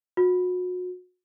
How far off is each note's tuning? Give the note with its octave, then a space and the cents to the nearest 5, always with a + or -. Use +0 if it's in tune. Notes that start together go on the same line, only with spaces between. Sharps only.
F#4 -35